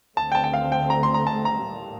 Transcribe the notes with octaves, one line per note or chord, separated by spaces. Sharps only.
D2 D3 A3 C4 A5
G5
A5
G5
F5
G5
A#5
C6
A#5
A5
A#5
A2 G3 A#3